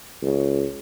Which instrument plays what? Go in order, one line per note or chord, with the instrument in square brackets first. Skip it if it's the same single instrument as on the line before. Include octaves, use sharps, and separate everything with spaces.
[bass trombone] C#2